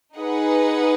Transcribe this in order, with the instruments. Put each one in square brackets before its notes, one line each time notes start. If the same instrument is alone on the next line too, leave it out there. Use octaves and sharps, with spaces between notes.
[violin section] D#4 G#4 B4 F#5